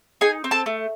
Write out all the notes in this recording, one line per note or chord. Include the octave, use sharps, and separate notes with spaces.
D#4 G#4 G#5
C4
A4 A5
A3